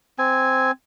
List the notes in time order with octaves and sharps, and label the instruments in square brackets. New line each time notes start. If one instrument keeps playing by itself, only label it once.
[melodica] C4 G#5